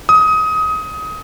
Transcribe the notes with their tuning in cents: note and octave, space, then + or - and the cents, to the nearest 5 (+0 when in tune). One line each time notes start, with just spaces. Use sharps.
D#6 +20